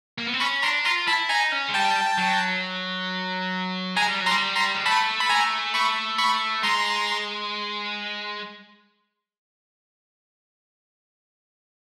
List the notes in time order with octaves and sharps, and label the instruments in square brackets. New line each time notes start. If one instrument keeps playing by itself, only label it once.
[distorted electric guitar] A#3
B3
C4
[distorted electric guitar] C#4 [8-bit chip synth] B5 C#6
[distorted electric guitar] D4 [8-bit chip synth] A#5 C6
[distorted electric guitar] F4 [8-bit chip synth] A#5 C6
[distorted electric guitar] E4 [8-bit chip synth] A5 B5
[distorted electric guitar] D#4 [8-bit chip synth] G#5 A#5
[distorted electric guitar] C#4
G#3
[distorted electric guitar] G3 [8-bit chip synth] G5 A5
[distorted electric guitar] F#3
[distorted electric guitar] G#3 [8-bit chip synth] G#5 A#5
[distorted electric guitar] G3
F#3
[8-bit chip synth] A#5 C6
[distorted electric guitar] G3
[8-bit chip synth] A#5 C6
[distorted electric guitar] G#3
[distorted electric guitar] A3 [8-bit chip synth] A5 B5
[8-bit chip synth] B5
G#5 A#5
B5 C#6
B5 C#6
[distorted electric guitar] G#3 [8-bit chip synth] A#5 C6